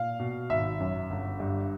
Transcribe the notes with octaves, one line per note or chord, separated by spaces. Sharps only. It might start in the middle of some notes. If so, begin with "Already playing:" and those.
Already playing: A#2 F5
B2
G#1 E5
F#2
G1
G2